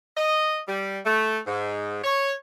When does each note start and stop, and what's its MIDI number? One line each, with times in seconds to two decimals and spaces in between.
0.17 0.59 75
0.68 0.99 55
1.05 1.39 57
1.47 1.99 44
2.04 2.33 73